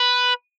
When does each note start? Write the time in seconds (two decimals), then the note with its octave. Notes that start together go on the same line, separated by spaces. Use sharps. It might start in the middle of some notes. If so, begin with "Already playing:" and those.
Already playing: B4